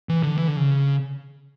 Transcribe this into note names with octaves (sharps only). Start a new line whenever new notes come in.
E3
D3
E3
D3
C#3